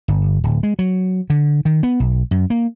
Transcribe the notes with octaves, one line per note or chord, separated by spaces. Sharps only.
G1
D1
G#3
F#3
D3
D#3
B3
B1
F#2
A#3